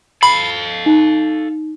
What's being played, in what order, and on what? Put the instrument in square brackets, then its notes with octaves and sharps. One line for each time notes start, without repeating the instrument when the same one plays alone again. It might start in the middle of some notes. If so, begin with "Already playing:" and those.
[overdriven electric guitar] A4 F5 [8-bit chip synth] B5
[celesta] D#4